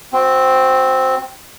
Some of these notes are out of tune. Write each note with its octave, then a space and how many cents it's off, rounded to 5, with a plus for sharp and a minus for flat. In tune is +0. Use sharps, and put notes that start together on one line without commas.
C4 +0 F#4 -25